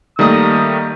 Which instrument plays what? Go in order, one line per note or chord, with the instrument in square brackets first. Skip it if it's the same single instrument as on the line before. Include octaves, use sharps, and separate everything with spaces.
[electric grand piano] D#3 G3 A3 [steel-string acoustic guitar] A#3 D#5 [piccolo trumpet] D#6